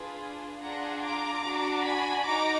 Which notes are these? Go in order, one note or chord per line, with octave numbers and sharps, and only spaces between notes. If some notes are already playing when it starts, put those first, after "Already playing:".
Already playing: D4 F4 G#4 B4
D4 F4 G#4 F#5 A#5
A#5 D6
D4 F#4
G#5 B5
D#4 F#4 A#5 D6